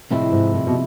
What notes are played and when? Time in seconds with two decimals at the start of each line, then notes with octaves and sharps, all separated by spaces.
0.10 A2 C3 F3 G#3 C4 E4
0.32 G#2
0.54 A2
0.67 B2